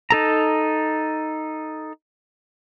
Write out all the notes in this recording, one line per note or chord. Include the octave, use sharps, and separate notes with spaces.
D#4 A4 A#5